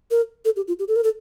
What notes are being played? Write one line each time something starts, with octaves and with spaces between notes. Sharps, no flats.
A#4
A4
G4
F4
G4
A4
A#4
A4